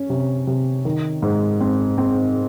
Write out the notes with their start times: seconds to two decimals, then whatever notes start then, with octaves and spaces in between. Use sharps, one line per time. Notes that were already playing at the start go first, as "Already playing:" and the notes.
Already playing: C#4
0.10 C3
0.47 C3
0.85 D#3
1.22 G#2
1.61 C4
1.98 C4